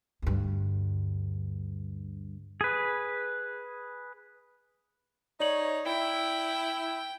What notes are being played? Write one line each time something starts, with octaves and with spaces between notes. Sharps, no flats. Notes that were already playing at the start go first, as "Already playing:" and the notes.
D2 G2
G#4 B4
D#4 C#5 D5 F#7
E4 G5